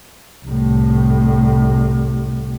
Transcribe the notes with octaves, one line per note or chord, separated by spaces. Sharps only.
C2 A2